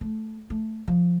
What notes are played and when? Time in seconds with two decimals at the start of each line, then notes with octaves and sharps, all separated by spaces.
0.01 A3
0.50 A3
0.88 F3